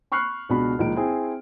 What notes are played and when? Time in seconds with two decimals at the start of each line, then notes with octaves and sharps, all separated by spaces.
0.12 B5 C#6 F6 F#6 C7
0.49 C#2 B2 D4 F#4 B5
0.79 C#2 A#2 F3 D#4 D7
0.96 C4 E4 G#4 G#5